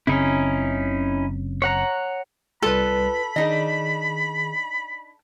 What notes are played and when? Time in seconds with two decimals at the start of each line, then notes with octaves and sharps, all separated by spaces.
0.07 F#1 C#3 C4 C#4 D#4 E4
1.62 C#5 F#5 A#5
2.62 C2 G3 F4 A4 B4 D5 B5
3.36 D#3 D4 D#4 G#4 D#5